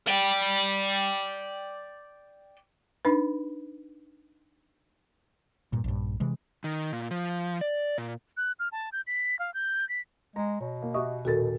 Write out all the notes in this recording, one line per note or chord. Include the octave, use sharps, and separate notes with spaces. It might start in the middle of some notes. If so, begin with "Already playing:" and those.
D5 G5
D4 D#4 B4
G2 A#2
A#1 G2
C3 E3 G#3
D#3
A#2
F3
D5
A#2
F#6
F6
A5
G6
B6
F5
G6
B6
G#3 A#5
B2 C#5
A#3
F#4 G4 D#5 E5 C#6 D#6
D#1 F#4 A4 A#4 A6